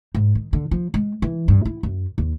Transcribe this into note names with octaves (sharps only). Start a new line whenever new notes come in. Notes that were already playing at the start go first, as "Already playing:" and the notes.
G#2
D#3
D3
F3
G#3
E3
G2
E4
F#2
D#2